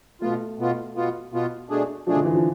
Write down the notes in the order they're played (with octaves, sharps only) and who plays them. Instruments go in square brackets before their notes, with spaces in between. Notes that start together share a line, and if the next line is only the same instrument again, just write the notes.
[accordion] B2 B3 F4 [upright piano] A3
[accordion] B2 B3 F4
B2 B3 F4
B2 B3 F4
B2 A3 D4 G#4
[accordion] B2 A3 D4 G#4 [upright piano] F3
[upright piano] D3
E3
F3